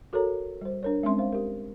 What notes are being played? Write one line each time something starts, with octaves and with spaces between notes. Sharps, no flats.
F#4 A4 A#4 C#5 A#5
G3 C5
D4 A#4 C#5
G#3 C4 C#4 E5 C6
C5 F5
G4 A#4